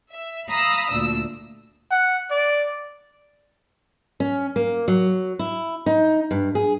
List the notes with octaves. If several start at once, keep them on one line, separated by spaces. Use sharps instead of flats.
E5
F5 A#5 B5 D#6 E6
D2 A#2 D4 E6
F#5
D5
C#4
A#3
F#3
E4
D#4
G2
G#4